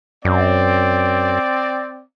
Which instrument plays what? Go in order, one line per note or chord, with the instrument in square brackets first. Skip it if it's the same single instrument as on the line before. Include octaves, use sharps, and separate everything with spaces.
[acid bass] F#2 [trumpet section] C4 D5